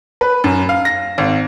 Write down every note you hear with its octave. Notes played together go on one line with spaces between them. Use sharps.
B4
F#2
F5
A#6
G#1